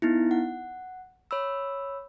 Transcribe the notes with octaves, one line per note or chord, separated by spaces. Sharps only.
B3 D#4 E4
F#5
C#5 B5 E6